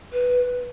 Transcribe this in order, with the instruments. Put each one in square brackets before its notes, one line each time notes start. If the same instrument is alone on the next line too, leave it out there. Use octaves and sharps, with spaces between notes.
[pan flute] B4